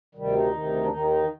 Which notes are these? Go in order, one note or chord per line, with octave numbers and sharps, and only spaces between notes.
D2 C3 D#3 G3
D#4
D2 C3 D#3
D4
D#2 D#3 D#4
D#4